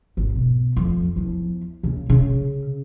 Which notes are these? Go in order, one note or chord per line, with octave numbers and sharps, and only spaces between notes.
G#1
B2
F2
E2 F3
C#3 A#3
C#3